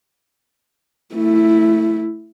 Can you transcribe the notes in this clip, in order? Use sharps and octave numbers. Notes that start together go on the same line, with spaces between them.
A3 E4